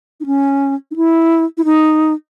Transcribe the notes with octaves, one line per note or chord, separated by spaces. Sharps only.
D#4
C#4
D#4
E4
E4
D#4